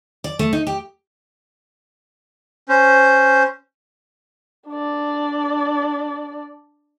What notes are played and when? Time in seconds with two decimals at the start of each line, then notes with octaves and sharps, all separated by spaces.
0.24 D5
0.39 A3
0.53 D#4
0.67 G4
2.69 C#4 C5
4.68 D4 D5